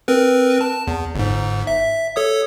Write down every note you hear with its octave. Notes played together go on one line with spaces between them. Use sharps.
C4 A#4 B4
A5
E2
G1 G#2
E5
A4 C#5 D#6